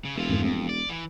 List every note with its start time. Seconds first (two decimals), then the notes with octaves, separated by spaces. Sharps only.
0.05 C#3
0.16 E1 E3 F4
0.29 F2 G#2 D3
0.42 F2 A3 C4
0.69 D5
0.90 E3